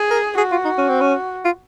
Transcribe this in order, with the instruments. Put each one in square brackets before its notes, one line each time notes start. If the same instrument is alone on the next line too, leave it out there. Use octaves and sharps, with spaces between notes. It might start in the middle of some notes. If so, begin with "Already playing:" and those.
Already playing: [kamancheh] G#4
[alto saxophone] A#4
[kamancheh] F#4 [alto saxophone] G#4
[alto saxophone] F4
D#4
C#4
C4
C#4
F4